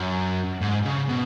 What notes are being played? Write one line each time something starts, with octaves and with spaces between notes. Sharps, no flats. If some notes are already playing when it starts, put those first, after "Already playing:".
Already playing: F#2
G#2
C#3
B2